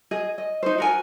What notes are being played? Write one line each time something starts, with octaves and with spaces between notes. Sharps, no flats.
G#4 D#5
D#5
D#4 C5
F#4 A#4 G#5